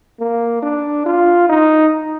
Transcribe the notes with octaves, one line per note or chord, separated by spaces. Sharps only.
A#3
D4
F4
D#4